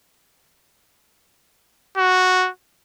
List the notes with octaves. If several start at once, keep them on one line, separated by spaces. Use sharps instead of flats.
F#4